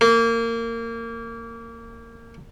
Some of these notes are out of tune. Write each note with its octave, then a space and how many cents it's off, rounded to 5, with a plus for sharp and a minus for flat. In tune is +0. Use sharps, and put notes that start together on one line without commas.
A#3 -20